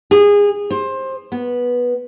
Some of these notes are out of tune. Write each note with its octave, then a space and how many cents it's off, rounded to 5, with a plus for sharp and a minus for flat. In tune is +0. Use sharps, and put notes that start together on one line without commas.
G#4 -25
C5 +20
B3 -10